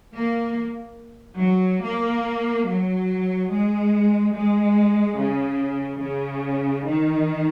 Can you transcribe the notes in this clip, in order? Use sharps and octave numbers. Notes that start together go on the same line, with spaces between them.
A#3
F#3
A#3
F#3
G#3
G#3
C#3
C#3
D#3